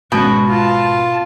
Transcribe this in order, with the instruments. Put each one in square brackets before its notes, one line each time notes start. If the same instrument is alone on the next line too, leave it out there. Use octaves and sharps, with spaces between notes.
[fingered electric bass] G#1 G#3 C#4 [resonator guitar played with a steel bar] B2 [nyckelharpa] F#4
[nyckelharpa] F4 A5